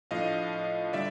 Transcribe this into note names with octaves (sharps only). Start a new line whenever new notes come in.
A2 F3 A3 D4 D#5 F5
D3 G3 D5 E5